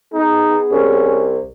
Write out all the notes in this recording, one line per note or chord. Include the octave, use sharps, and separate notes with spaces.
B3 D#4 G#4
C2 C#4